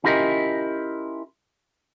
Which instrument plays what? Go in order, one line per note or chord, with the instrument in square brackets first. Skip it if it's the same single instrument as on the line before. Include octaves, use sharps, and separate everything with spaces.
[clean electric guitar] C#4 E4 F4 G4 A#4 D#5